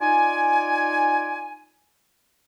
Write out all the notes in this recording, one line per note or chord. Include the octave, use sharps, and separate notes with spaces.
D#4 F4 D5 G#5